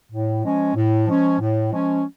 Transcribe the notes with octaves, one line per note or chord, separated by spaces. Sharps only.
A2
F3 G#3 C#4
A2
F3 G#3 C#4
A2
F3 G#3 C#4